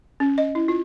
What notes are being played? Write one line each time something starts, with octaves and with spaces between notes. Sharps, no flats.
C#4
D#5
E4
F4